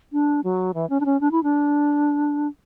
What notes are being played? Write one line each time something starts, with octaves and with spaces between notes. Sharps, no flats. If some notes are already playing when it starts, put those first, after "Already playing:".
D4
F#3
E3
C#4
D4
C#4
D4
E4
D4